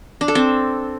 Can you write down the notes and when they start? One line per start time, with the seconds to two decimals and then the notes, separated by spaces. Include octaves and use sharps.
0.21 D4
0.28 A4
0.35 C4